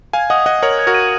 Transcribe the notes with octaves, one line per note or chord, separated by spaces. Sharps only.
F5 G#5 G#6
D#5 F#5 D#6
D#5 F#5 D#6
A#4 C#5 F#7
G#6
F#4 A#4
D#7